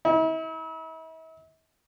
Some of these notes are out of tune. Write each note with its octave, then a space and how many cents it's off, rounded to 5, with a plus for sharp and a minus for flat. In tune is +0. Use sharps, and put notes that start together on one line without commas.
E4 -40